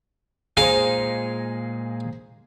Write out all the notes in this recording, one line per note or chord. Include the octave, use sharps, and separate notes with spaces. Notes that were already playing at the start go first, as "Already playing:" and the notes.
A#2 G#3 D#4 G#4 C5 F5